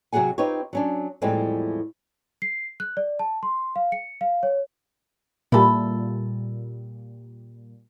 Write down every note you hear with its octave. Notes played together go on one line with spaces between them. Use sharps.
C3 F#3 F#4 G#4 F#5 G#5
C4 D#4 F4 G4 B4 C#5
F#3 C#4 D4
E2 A2 F3 G3 G#3 C4
C7
F#6
D5
A5
C6
F5
C#7
F5
C#5
A#2 G3 E4 A4